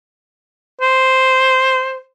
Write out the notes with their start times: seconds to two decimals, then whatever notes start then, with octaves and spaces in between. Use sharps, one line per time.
0.81 C5